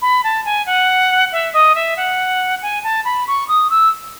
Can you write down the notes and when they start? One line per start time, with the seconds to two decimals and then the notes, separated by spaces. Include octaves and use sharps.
0.02 B5
0.24 A5
0.45 G#5
0.66 F#5
1.32 E5
1.53 D#5
1.75 E5
1.97 F#5
2.62 G#5
2.84 A5
3.05 B5
3.27 C#6
3.48 D#6
3.70 E6